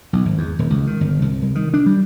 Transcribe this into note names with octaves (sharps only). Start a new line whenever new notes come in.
B1
G#1
E2
D#1
C#2
D#3
G1
C2
C2
D#3
D4
G3